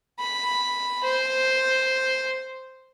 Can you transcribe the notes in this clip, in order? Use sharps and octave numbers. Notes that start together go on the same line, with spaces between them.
B5
C5